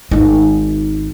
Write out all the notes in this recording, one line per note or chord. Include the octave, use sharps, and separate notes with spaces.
G#1 D#4